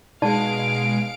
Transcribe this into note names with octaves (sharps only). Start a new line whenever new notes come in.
B2 G#3 D#4 G#4 D5 F5 A5 D7